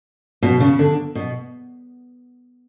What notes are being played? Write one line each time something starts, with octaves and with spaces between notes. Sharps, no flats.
B2
C#3
D3
B2